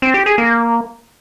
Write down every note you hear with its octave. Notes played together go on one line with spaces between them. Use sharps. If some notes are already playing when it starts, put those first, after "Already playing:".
C4
G4
G#4
A#3